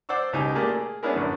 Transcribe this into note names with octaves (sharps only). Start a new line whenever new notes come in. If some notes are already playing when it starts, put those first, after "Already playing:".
C5 D5 F#5 D6 E6
C#2 B2 D#4 G4 G#5
A#2 A3 A#3 G4 G#4
G#4
B3 C#4 D4 E4 G#4 A#4
A#1 F#2 A2 D3 D4 C#6